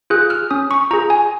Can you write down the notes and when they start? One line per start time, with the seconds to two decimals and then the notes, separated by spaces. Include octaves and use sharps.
0.10 F4 G#4 F#6
0.30 F6
0.51 C#4 D#6
0.71 C#6
0.91 F4 G#4 A#5
1.10 G#5